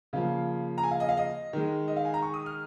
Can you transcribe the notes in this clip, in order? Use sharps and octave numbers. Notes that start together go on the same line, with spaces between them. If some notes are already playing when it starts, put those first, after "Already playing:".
C#3 F3 A#3 F5
A#5
G#5
F5
D#5
F5
D#5
D#3 G#3
D#5
F5
G#5
A#5
C#6
D#6
F6